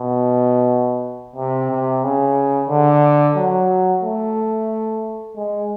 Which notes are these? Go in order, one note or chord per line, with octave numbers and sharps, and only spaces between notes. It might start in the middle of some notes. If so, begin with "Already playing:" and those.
Already playing: B2
C3
C3
C#3
D3
F#3
A3
G#3